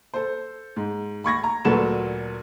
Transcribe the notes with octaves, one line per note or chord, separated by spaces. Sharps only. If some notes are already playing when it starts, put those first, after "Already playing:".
A4 C5
G#2
B5 C#6 G#6 A#6
A#5
D2 A#2 F#3 A4 B4 E7